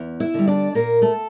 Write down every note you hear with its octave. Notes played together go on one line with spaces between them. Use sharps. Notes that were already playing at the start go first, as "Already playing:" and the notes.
Already playing: E2
E4 E5
D3 G3
D4 D5
A#2 A#3 A#4
A3 A4